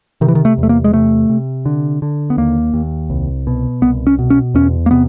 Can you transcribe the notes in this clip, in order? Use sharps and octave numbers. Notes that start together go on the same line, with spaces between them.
C3 D#3
E3
D#3
A3
E2
A3
A#3
G#3
C3 A3
C3
D3
D3
B3
D#2 A#3
D#2
C2
B2
C2 B3
C#4
B2
C#4
E2 C#4
A#3
C3 B3